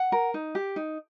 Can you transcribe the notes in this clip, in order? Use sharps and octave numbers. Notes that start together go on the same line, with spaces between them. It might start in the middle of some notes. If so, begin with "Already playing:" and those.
Already playing: F#5
A#4
D#4
G4
D#4